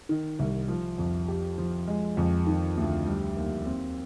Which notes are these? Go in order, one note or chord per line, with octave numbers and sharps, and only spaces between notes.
D#3
C2
F3
F2
G4
F3
G#3
F2
D#3
D2
G3
D#2
C4